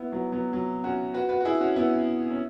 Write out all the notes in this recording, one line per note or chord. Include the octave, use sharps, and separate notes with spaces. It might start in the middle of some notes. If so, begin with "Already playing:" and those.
Already playing: B3 E4
F#3 B3
F#3 B3
F#3
C#4 F#4
F#4 B4
F#4 B4
F#4
E4 G#4
C#4 F#4
B3 E4
C#4